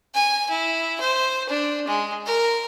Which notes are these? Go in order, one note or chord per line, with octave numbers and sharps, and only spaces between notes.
G#5
E4
C5
D4
G#3
A#4